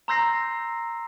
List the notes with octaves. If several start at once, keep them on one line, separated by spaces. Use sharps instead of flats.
A#5 C6 E6 G6 A#6 C7